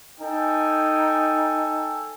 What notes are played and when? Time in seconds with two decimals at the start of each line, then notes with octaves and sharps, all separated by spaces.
0.20 D#4 A4 G5 G#5